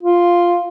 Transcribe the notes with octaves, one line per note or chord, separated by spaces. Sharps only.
F4